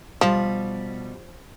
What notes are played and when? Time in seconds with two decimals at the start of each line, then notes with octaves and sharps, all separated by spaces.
0.21 B2 F3 G3